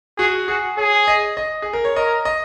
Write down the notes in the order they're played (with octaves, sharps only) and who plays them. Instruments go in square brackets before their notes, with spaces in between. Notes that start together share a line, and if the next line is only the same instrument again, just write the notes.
[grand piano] F#4 [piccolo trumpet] G#4
[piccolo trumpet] F#4 [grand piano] G#4
[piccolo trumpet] G#4 [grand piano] C#5
[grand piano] D#5
D#5
G#4
A#4
C#5
[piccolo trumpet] A#4 [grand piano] D#5
[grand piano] D#5